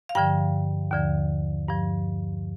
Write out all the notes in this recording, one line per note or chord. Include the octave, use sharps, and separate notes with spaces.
F5
G2 D3 F3 G5
D#2 D3 F3
G2 F3